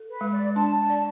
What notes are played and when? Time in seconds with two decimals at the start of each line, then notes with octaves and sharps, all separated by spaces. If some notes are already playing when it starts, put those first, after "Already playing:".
Already playing: A4
0.10 B4
0.21 G#3
0.33 D5
0.55 D4 A5
0.79 A5
0.90 D5